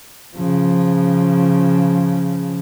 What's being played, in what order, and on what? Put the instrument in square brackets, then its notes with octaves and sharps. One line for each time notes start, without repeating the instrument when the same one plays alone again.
[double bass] C#3 F3